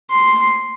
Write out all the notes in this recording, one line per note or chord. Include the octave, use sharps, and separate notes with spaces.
C6